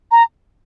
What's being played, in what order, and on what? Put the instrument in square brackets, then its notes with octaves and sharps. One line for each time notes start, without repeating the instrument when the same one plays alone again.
[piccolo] A#5